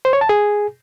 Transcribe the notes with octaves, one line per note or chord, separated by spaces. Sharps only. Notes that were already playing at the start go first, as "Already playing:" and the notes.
C5
C#5
A5
G#4